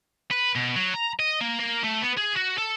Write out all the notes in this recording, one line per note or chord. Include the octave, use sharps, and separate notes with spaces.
B4
B2
F#3
A#5
D#5
A#3
A#3
A3
B3
G#4
F#4
A4